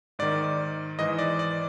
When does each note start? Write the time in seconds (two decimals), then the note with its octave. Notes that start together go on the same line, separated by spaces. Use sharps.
0.19 G#2 D#3 D5
0.99 G#2 E3 D#5
1.19 D5
1.39 D5